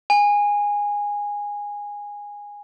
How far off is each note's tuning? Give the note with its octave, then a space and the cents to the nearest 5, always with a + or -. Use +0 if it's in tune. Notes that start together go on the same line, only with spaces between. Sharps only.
G#5 -15